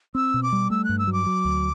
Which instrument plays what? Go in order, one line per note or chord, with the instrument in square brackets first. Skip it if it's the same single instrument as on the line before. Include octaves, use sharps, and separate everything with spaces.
[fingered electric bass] C4 [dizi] E6
[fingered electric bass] B2
[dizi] D6
[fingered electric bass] G3
[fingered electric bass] A3 [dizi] E6
[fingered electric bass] G2 [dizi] F#6
[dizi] E6
[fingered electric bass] F#3
[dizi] D6
[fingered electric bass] F#3
D2